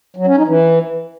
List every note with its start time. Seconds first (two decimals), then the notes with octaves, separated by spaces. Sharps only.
0.16 F#3
0.27 C#4
0.37 D#4
0.47 E3